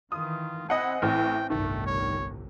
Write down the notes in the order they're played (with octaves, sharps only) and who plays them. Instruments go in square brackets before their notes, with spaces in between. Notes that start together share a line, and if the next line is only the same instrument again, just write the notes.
[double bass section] D#3 E3 [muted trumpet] F4 [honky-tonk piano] D#6
[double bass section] C4 [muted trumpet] E4 [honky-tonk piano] D#5 F#5 G#5
[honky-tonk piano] A1 A2 [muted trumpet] G5
[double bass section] G1 C2 A2 [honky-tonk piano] D#3 [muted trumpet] A3
[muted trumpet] C#5